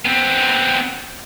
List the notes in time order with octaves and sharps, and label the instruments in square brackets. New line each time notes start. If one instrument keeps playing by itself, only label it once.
[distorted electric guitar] B3 C4